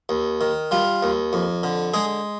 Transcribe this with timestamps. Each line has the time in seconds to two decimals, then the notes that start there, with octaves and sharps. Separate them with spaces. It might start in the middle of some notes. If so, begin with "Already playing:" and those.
0.09 D#2
0.41 D#3
0.71 G3 F4
1.03 D#2
1.33 F2
1.63 D3
1.94 G#3 G#4